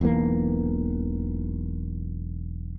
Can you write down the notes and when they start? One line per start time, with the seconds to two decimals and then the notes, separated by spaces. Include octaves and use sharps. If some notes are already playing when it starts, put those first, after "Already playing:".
0.01 E1 B1 E3 A#3